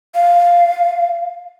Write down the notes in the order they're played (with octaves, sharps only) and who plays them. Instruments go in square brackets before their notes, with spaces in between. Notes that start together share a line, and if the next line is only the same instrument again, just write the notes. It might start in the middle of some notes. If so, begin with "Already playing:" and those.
[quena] F5